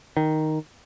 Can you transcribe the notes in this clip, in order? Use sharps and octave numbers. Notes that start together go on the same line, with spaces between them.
D#3